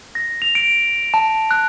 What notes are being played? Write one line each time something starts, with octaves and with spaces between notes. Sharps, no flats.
A#6
F7
D7
A5
F#6